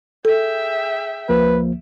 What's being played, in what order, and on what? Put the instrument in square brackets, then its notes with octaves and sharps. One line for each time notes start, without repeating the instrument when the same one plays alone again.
[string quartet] G#4 E5 G5 [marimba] A4
[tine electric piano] C#2 F3 A#3 [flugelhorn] B4